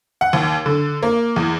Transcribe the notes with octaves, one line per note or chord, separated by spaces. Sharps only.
F#5
D#2
D3
A#3
E2